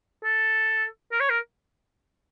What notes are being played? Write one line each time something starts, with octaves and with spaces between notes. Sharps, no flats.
A4
A#4
C#5
A#4